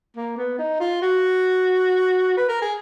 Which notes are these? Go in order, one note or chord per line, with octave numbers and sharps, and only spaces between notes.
A#3
B3
D#4
F4
F#4
B4
A#4
G#4